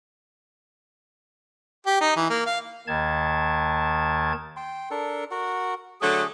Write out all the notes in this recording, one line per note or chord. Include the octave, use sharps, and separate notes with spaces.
G4
D#4
E3
A#3
F5
D#2 D#3 A5 G#6
G5 C6
D4 A4 A#4
F#4 A#4 F#5
D3 F#3 A3 G#4